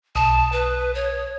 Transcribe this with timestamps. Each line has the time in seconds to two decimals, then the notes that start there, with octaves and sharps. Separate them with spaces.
0.15 B1 A5 D#6
0.52 B4
0.95 C#5